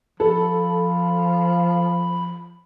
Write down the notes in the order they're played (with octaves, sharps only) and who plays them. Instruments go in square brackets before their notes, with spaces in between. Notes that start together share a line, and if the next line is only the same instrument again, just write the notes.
[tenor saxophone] F3 [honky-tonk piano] A4 [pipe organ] B5